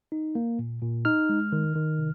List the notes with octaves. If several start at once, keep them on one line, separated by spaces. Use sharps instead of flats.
D#4
A#3
A#2
A#2
D#4 F6
G#3
D#3
D#3
C3